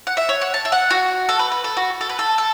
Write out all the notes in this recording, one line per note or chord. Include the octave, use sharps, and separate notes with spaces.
F#5
E5
C#5
F#5
A5
E5
F#5
F#4
A4
B4
B4
A4
F#4
A4
B4
A4
A4